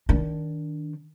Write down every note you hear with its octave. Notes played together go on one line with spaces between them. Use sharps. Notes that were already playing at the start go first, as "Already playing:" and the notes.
D#3 D4